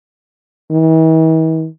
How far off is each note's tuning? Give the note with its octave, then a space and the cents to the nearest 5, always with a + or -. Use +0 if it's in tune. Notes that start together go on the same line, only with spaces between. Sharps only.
E3 -45